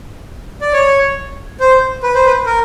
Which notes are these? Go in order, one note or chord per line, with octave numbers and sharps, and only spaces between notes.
D5
C#5
C5
B4
C5
B4
A#4